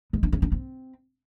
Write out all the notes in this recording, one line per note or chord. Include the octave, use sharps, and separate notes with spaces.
G#3
D4
C#4
D4
C4